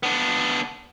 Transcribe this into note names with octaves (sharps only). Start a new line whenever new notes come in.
B3 D4